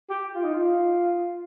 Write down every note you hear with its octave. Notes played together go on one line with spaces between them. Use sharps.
G4
F4
D#4
F4